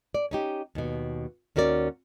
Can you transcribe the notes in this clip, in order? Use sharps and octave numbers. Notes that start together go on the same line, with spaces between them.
D5
C#4 D#4 G4
D#2 B2
D#2 C#4 F#4 A#4 D5